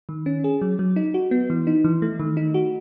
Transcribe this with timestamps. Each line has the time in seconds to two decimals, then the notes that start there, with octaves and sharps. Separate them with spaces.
0.09 D#3
0.26 C#4
0.44 G#4
0.61 F#3
0.79 F#3
0.96 D#4
1.14 F#4
1.31 B3
1.50 E3
1.67 D#4
1.84 E3
2.02 A3
2.20 D#3
2.37 D#4
2.54 F#4